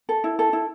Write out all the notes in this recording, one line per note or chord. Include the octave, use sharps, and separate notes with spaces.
A4
E4
A4
E4